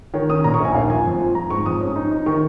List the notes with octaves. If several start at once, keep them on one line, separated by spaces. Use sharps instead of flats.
D#3 C#5
C#4 D#6
A#2 A#5
C#6
A#1
G#5
D#2 F5
F3 G#5
F2
F3
F3 A#5
G#2 C#6
F2 D#6
C#4
D#4
D#4
D#3 C#6